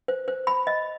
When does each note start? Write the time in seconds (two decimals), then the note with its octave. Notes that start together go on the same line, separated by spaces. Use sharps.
0.08 C5
0.28 C5
0.47 B5
0.67 D#5